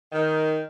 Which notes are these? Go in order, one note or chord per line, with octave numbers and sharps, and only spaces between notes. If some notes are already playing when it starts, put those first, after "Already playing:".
D#3